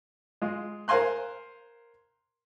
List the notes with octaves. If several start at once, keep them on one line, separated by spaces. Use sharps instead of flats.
G#3 F4
A#4 C5 F5 G#5 C6 F#6